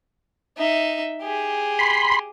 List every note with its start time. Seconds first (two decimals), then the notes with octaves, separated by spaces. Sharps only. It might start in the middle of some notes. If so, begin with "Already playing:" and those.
0.57 D#4 E5
1.22 G4 G#4
1.79 B5 C6